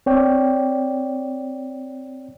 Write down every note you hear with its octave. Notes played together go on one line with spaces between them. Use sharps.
C4 C#5 D5 G5